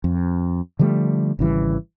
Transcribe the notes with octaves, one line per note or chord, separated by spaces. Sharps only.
F2
D3 F3 G3 A3
G#1 C#3 E3 G3